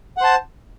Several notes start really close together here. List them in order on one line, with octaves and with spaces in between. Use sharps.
F#5 C5 A5